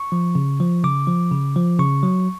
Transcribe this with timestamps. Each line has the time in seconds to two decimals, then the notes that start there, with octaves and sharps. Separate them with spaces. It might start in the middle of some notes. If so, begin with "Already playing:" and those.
Already playing: C#6
0.12 F3
0.35 C#3
0.60 F3
0.84 C#3 D6
1.07 F3
1.31 C#3
1.56 F3
1.79 C#3 C#6
2.03 F#3